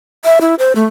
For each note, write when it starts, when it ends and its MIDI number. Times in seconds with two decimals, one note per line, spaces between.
0.24 0.39 76
0.41 0.55 64
0.59 0.73 72
0.75 0.85 57